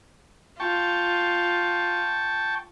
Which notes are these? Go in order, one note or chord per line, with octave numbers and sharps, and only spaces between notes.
F4 G5 A5 C#6